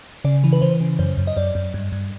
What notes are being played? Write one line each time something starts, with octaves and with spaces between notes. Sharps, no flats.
C#3 D5
E3
B4
E3 C5
C#3
F#2 C5
F#2
D#5
F#2 D5
F#2
G2
G2